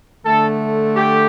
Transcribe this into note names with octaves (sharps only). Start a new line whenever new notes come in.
D3 A3 A4
G4